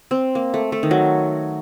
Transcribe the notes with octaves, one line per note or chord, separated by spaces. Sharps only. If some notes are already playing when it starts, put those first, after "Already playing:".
C4
A#3
A3
A3
D#3
F#3